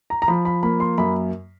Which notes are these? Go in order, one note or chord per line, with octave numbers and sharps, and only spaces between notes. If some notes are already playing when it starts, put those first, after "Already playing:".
A#5
A#5
F3 B5
B5
A#3 B5
C6
F#2 B5